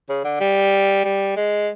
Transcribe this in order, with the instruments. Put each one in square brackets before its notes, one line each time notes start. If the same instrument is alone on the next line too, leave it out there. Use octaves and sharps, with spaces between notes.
[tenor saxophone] C#3
D3
G3
G3
G#3